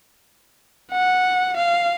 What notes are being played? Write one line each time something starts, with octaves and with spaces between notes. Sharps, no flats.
F#5
F5